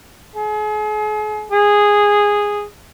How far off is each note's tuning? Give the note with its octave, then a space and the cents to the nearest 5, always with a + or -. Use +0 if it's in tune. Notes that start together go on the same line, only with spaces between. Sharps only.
G#4 +40
G#4 -10